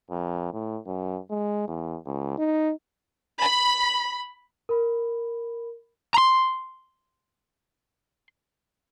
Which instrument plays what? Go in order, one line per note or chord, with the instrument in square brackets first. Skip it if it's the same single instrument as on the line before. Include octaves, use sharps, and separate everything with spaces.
[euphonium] F2
A2
F#2
G#3
E2
C#2
D#4
[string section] B5
[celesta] A#4 B5
[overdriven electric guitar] A#5 C6